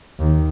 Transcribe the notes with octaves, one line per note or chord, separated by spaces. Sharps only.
D#2